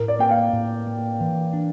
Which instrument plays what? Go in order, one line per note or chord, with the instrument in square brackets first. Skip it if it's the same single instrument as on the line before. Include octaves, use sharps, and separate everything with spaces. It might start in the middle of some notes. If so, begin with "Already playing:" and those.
Already playing: [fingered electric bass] A2 [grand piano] A#4
[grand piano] D5
[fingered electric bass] A#3 [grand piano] G5
[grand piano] F5
[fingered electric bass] A2
A#3
E3
D4